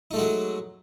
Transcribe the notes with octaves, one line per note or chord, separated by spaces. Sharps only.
F#3 G#3 A3 D#4 F#4